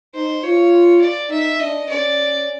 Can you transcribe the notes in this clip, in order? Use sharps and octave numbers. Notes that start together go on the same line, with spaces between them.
D#4 C5
F4 C#5
D5
D#4 E5
D4 D#5
C#4 D5